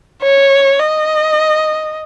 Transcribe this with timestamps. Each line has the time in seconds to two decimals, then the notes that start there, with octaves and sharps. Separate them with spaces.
0.23 C#5
0.79 D#5